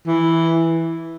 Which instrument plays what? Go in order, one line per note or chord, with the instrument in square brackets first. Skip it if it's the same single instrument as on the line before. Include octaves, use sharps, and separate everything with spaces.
[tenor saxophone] E3